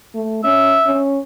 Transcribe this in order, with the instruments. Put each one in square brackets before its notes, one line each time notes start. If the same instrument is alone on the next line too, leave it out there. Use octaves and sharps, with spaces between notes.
[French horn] A3
[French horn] C#4 [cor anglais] E5
[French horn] C#4